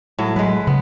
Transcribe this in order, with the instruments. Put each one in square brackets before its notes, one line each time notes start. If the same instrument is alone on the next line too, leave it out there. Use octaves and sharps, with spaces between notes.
[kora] A2 F#3
[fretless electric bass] F#3 [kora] G#3 B4
[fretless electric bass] C#3 [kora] B3